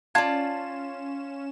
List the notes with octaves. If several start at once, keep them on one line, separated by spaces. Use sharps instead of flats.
C#4 F4 D5 A5 G#6 E7